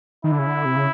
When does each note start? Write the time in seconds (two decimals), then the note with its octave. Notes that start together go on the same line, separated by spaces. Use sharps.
0.24 D#3 E4
0.32 D3
0.39 C#3
0.47 D3
0.65 C3
0.76 C#3